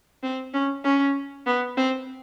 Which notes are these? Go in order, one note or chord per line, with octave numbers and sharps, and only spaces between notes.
C4
C#4
C#4
B3
C4